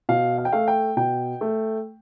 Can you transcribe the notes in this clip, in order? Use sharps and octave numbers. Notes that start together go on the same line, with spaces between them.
B2 F5
F5
G5
A3 F5
G5
B2 G5
A3